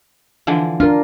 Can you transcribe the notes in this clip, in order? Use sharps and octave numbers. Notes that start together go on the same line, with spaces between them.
D3 E3 F3
D4 F4 A#4